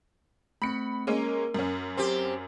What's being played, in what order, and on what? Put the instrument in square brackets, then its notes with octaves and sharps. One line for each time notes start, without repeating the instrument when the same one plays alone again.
[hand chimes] A3 C4 [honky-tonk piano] B5 C#7
[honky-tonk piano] G#3 A#3 C#4 [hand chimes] A#4
[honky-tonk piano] F#2 C#4
[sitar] C4 G4